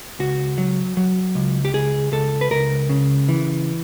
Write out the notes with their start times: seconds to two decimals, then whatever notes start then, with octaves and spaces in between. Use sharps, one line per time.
0.19 C#2 F#4
0.58 F#3
0.97 F#3
1.35 C#2
1.65 G4
1.74 C#2 G#4
2.12 C#2 A4
2.41 B4
2.51 C#2 A#4
2.89 C#3
3.29 E3